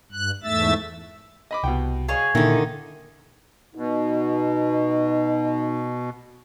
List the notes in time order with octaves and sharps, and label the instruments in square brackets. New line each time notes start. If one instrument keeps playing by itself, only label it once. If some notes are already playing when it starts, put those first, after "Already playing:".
[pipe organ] G2 F#6
E2 G#2 A3 E5 E6 A6
[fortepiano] D#5 B5 D6
[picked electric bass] C2 [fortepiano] B2 F#5 G5
[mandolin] G#4 C#5 D#5 [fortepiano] F5 C#6
[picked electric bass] A#2 [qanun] D3 D#3 [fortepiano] E4
[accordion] B2 [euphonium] D#4